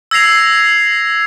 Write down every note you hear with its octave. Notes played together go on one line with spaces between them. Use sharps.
E6 G#6 A#6 C7 F7